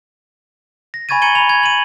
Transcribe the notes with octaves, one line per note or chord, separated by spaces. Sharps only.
A#6
G#5 B5 C#6 G#6 A6 D#7
A#5 G#6 C#7 D#7 F#7 G7
B5 F7
G#6
D#7 F#7